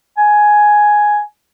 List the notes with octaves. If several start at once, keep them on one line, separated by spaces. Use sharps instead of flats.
G#5